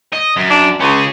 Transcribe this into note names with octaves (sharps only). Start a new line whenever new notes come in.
D#5
F#2
D4
C#2 C#4 G#4